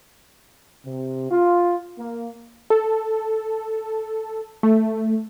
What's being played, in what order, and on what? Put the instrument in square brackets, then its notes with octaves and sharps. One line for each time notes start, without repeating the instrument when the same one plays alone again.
[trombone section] C3
F4
A#3
[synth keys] A4
A3